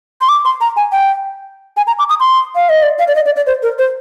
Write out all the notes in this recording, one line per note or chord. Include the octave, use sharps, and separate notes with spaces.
C6
D6
C6
A#5
G#5
G5
G#5
A#5
D6
D#6
C6
F5
D#5
D5
F5
D5
D#5
D5
D5
C5
A#4
C5